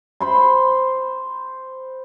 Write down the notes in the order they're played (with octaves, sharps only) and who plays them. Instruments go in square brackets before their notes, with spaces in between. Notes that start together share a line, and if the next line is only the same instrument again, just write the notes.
[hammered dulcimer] C5 B5 C6